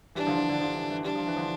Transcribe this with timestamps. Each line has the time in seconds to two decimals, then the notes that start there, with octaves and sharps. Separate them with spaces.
0.15 E3 G3 D4
0.26 D3 F3
0.38 D3
0.49 D3
0.60 D3 F3
0.76 E3
0.90 E3
1.05 G3 D4
1.15 F3
1.27 E3
1.37 D3 F3